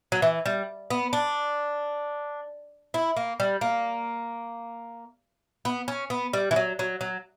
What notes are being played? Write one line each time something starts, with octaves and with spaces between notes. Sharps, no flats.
F#3
E3
G3
B3
D4
E4
A#3
G3
A#3
B3
C#4
B3
G3
E3
F#3
F#3
F#3